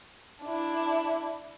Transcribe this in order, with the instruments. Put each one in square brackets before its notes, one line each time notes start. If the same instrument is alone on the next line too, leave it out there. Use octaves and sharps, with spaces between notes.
[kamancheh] D4 E4